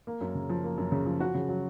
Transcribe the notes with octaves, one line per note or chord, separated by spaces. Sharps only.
A#3
F#2
C#3
F3
A#3
F#2
C#3
F3
F#4
C#3
F#3